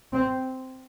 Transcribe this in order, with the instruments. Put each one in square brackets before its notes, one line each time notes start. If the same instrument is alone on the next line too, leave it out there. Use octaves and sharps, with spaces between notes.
[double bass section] C4